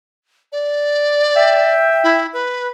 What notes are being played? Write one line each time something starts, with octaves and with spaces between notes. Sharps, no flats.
D5
E5 G5
E4
B4